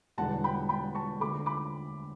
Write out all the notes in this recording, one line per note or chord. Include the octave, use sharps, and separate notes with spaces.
E1 E2 D3 G3 F#5 A5
G5 B5
G5 B5
A5 C#6
D2 D3 A3 B5 D6
B5 D6